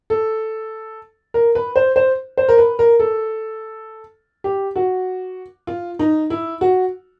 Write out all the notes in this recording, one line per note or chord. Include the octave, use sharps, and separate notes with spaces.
A4
A#4
B4
C5
C5
C5
A#4
B4
A#4
A4
G4
F#4
F4
D#4
E4
F#4